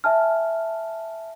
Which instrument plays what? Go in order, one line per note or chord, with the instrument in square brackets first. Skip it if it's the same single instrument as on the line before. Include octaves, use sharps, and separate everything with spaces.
[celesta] E5 G#5 A5 F6